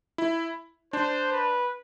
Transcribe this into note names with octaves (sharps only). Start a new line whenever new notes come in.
E4
D4 C5
B4